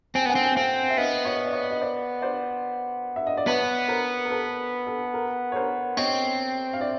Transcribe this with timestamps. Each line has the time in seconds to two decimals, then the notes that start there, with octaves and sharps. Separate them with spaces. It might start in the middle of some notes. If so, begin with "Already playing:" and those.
0.15 C4 G#5
0.22 G5
0.26 B3 F#5 G#5
0.35 C4
0.45 G#5
0.56 C4 F5 G5
0.90 E5
0.97 B3 D#5 F5
1.25 C#5 D#5
1.46 D5
1.53 C#5 D#5
1.71 D#5
1.81 C5 D5
2.22 C5 D5
3.16 E5
3.27 D#5
3.37 D5
3.47 B3 B4 C#5
3.88 A#4 C5
4.25 A#4
4.30 A4 B4
4.86 A4
5.14 A#4
5.52 C#5
5.56 A#4 C5
5.97 C4 C#5 D#5
6.73 F5
6.80 D5 E5